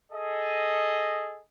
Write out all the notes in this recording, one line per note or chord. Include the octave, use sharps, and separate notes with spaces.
G#4 A4 D#5